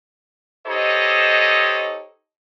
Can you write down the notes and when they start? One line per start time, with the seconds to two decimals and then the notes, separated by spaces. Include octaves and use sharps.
0.67 D#4 G4 A4 C5 C#5 D#5